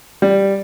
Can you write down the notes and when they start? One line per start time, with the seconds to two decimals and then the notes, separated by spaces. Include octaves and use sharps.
0.22 G3